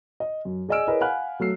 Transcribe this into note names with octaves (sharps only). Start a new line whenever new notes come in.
D#5
F#2
G#4 D5 D#5 G#5 E6 D7
E4 G#4 A#4 B4 C#5 D#5
F5 F#5 G#5 B5 F6 F#6
F#3 A3 E6 C7